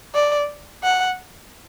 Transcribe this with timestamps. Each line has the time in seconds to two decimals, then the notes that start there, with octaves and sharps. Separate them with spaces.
0.15 D5
0.84 F#5